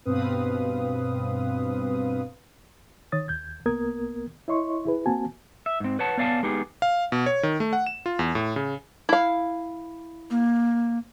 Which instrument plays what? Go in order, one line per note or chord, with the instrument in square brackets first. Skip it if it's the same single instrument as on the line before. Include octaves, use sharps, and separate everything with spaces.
[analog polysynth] G2 B2 C4 B4 F5 D#6
[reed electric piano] D#3 C#5 D#6 A6
D#2 G6 G#6
C2 A#3 B3 A#4 D#6 G#6
E4 C#5 D#5 C6 C#6
E4 G#4 B4
A#3 C4 F#4 G#5 A5
[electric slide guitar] E5
G#2 C4
B4 C#5 F#5 A5
B3 C#5 D5 F5 G#5 A5
G#3 B3 D#4 G4 G#4
[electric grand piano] F5
B2
C#5
D#3
A3
F#5
E7
F4
E2
A2
C#3
[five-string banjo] E4 F5
[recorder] A#3